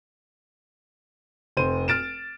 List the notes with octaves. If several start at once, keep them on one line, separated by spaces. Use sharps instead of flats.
F1 C5 D#7
F6 A6 D7 E7